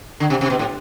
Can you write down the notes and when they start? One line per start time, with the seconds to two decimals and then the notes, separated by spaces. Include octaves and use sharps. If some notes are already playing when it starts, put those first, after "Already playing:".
0.20 D3
0.30 C3
0.41 C3
0.50 B2
0.59 A2